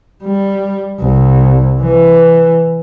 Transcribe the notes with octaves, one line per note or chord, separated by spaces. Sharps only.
G3
C2
E3